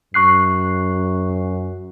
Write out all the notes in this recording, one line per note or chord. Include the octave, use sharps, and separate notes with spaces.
F#2 C#6 F#6 C7